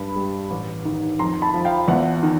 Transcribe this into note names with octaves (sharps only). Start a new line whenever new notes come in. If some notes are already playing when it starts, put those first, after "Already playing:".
Already playing: G2 B5
G3
A1
D#3
F2 A#5 C6
A5 B5
F3
F5 G5
E2 E5 F#5
D#3